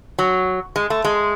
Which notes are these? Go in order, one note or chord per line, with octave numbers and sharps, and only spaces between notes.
F#3
G#3
A3
G#3